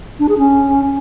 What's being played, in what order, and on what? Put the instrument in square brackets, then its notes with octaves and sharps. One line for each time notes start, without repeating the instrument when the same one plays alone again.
[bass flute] D4
G#4
C#4